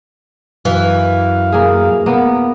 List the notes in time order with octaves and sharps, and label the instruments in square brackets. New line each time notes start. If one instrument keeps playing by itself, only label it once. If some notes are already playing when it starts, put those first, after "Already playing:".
[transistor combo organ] F#2 F5 [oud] E3
[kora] A#3 G#4
A#3 B3